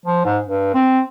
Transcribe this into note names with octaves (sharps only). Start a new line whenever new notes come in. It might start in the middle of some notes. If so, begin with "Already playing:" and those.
F3
G#2
G2
C4